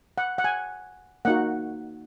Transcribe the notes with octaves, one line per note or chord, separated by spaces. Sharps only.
F#5
F#5
G#5
A#3 D#4 F#4 F#5